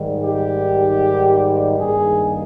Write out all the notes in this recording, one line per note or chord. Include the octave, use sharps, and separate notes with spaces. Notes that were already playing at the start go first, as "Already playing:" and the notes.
Already playing: G#2 D#3 G3
G4
G2 D#3 A#3 G#4